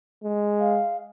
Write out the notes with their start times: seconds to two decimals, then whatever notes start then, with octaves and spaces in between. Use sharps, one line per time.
0.24 G#3
0.60 F5